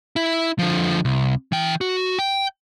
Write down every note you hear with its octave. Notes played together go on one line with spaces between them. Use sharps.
E4
D3 F3
C2
E3 G5
F#4
G5